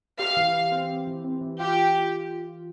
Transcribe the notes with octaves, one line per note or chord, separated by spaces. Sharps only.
G4 F5
E3
E3
C4
C4
E3
C4
E3
F4 G4